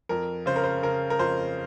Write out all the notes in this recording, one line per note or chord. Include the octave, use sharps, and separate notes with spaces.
F2 A#4
C#3 C5
A#4
C5
C#3 A#4
A#4
F2 C5